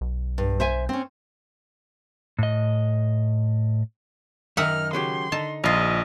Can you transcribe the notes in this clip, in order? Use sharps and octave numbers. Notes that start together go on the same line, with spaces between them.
B1
G2
C5 E5 G#5
C4 C#4
A2 D#5
F#2 D#3 D#4 E5 F#5 F6
C#3 F#3 G4 C6
D3 D#4 A5
A#1 F4 D#5 A#5